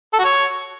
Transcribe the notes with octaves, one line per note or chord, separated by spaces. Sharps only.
A4
F#4
C#5